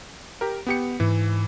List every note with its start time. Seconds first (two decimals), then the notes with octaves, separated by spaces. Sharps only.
0.41 G4 A#4
0.67 B3 G4 C#7
1.00 G#2 E3